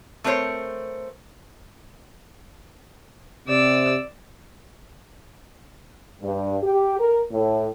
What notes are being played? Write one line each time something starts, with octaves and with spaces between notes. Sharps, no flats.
A3 C4 A#4 C5 C#5
C3 D5 E6
G2
G4
A#4
A2